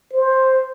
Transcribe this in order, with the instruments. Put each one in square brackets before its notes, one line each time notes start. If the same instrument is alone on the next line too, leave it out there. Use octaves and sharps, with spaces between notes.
[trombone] C5